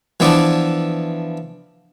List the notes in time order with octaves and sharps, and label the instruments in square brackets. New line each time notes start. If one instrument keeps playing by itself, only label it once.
[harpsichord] E3 F3 B3 D4 E4